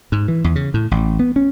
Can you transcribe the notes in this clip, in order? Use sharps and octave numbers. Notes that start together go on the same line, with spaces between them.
G#2
E3
E2
C#3
A2
A1
B3
C#4